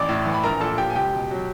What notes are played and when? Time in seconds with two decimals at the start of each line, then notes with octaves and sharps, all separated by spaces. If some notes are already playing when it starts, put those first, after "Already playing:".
Already playing: A1 D5 D6
0.09 A2
0.26 E3
0.34 B5
0.44 A#1 A#4 A#5
0.61 A#2 A4 A5
0.78 F3 G4 G5
0.90 G#5
0.95 C#2 G4 G5
1.13 B2
1.31 F#3